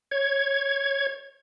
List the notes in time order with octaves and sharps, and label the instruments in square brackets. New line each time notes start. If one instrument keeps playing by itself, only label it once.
[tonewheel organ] C#5 G#6